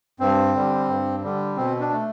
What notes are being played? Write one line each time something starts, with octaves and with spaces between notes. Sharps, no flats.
G2 C4
D3 G3
G2
D3 G3
B2 C4
D4
A3